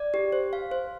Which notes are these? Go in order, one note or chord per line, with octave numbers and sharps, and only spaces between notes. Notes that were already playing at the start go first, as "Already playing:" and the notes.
Already playing: D5
G4
C5
F5
C5